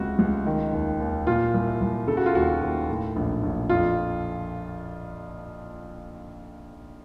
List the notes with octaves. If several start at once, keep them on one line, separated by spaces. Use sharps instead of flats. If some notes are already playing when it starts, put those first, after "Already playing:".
Already playing: C#2 C3 F#4
C#2
D#3
D#2
D#2
A#2 F4
C2
C2
C#3 A4
F#4
F4
D#2 F#4
D#2
A2
A#1
A#1
F2 F4